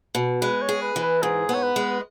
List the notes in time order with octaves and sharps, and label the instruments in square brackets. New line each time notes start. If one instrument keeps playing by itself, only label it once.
[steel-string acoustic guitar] B2
[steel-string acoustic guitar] G#3 [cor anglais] B4
[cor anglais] C#5
[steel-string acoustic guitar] G#4
[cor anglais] B4
[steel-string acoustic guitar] E3
[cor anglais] B4
[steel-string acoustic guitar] G#2 [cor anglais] G#4
[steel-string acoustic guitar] B3
[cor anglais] C#5
B4
[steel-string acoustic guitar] G#3